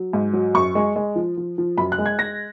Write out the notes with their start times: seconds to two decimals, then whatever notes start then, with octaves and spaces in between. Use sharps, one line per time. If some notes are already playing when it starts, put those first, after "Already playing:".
Already playing: F#3
0.13 G#2
0.33 F#3
0.54 F#2 C#6
0.75 G#3
0.96 G#3
1.16 F3
1.37 F3
1.58 F3
1.78 F#2 B5
1.92 F#6
1.98 G#3
2.06 G#6
2.19 G#3 A#6